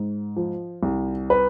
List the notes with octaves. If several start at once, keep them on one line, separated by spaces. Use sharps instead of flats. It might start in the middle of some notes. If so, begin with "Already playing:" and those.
Already playing: G#2
F3
C2
B4